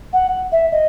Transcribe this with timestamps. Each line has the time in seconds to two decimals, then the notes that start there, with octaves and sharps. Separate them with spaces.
0.13 F#5
0.52 E5
0.72 D#5